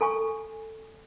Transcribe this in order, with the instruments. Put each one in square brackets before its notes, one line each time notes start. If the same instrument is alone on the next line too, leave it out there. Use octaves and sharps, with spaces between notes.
[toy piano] A4 G#5 C#6